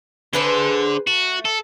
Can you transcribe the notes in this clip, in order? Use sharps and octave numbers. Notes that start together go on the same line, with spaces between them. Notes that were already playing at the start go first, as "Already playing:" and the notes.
D3 G#4 B4 C5
A3 F#4
A4